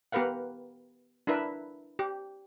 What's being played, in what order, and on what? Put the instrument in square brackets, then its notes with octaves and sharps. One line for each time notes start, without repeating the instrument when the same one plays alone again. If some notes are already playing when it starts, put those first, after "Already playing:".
[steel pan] B3 G4 A#4 B4 F5 F#5
D4 E4 A#4 B4 E5
G4